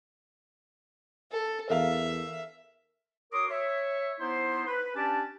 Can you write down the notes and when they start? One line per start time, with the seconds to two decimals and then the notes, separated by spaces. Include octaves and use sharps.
1.32 A4
1.70 E2 A#4 E5 F5
3.32 F#4 A#4 C#5 C6 D6 D#6
3.50 C#5 E5
4.20 B3 D#4 E4 C5
4.67 B4
4.95 C#4 D4 G4 D5 A5